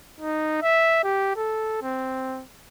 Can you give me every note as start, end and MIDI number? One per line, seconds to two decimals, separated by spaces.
0.21 0.60 63
0.62 1.03 76
1.04 1.35 67
1.36 1.82 69
1.82 2.43 60